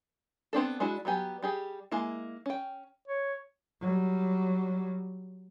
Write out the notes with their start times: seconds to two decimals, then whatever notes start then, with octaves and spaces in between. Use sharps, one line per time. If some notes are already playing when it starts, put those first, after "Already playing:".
0.53 B3 C4 D4 A4
0.80 G#3 D4 E4 F#4
1.05 F#3 G3 B3 G4 G#5
1.42 G3 G4 G#4
1.92 G#3 A#3 E4
2.46 C#4 G5
3.08 C#5
3.80 F#3 G3